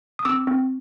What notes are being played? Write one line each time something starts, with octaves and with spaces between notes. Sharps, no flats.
D#6
C4 D6 E6
C4